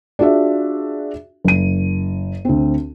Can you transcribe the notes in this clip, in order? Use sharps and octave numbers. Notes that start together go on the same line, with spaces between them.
D4 F4 F#4 G#4 E5
F#1 D#7
D2 C4